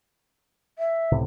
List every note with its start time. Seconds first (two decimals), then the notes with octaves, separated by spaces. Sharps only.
0.79 E5
1.12 C#2 A2 C3